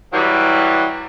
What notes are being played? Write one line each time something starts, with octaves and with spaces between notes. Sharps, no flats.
E3 F#3 G3